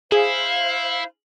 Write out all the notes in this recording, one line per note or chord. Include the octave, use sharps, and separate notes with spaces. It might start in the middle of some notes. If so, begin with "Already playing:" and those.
E4 G#4 C5 F5